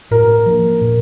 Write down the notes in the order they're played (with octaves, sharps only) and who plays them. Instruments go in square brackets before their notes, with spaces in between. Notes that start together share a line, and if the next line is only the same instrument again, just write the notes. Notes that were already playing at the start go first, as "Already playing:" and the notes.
[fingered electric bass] A2 [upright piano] A#4
[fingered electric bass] F3 A#3 D4
A#2